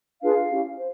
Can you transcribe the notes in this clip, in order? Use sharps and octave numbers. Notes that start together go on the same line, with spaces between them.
D4 F4 G#4 B4 F5
C#4 E4 G4
C5